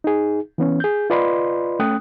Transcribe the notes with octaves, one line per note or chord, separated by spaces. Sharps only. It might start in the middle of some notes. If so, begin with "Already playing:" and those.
D#4 G#4
E3 B3 C#4
G#4 G6
F4 B4 D5 D#5 B5 C6
A3 C#4 G5 D#6 F#6